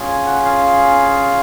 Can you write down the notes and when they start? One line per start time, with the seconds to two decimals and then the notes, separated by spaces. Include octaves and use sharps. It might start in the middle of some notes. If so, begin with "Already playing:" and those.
Already playing: C#4 F4 G#4
0.08 G#5
0.26 F#5
0.45 F5